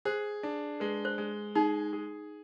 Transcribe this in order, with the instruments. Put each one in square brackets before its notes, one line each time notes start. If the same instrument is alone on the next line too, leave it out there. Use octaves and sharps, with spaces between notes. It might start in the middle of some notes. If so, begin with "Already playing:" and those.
[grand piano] G#4 [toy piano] C5
[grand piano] D4
[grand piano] G#3 [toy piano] B4
[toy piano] C5
[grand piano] G#3
[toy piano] D#4 [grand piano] G#4
[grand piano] G#4